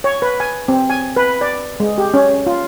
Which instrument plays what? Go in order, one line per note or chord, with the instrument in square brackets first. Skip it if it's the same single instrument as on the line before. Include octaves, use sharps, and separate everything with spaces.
[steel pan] C#5
B4
G#5
C4
G#5
B4
D5
G#3
G4
C#4
F4